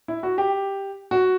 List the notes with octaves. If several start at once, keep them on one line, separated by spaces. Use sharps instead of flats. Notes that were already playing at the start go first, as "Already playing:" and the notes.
E4
F#4
G4
F#4